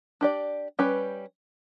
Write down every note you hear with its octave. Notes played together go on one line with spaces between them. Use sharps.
D4 G4 D5
G3 C#4 G4 B4